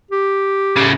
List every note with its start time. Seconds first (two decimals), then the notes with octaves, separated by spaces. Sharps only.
0.11 G4
0.76 A2 C#3